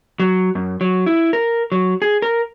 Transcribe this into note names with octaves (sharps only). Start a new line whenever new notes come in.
F#3
F#2
F#3
E4
A#4
F#3
G#4
A#4